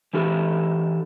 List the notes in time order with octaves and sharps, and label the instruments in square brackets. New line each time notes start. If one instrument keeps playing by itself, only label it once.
[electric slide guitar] E3 D4 G4 A4